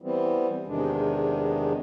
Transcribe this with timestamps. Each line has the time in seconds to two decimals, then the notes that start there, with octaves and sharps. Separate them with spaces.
0.02 E3 G3 B3 C4
0.67 E2 C3 D#3 G#3 D4